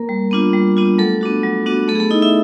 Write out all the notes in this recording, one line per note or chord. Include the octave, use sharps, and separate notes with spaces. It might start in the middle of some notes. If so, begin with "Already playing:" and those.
Already playing: A#3 A#4
G3
B3 D4 F4
G3
B3 D4 F4
F#3 A3 A4
B3 D4 F#4
F#3
B3 D4 F#4
A3 B3 A4
G#4
A3 A4
D#4 E4 D#5
E4 E5